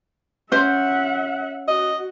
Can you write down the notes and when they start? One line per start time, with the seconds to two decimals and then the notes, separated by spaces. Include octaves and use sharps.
0.52 C#4 C5 E5 F#5
1.68 F#4 D#5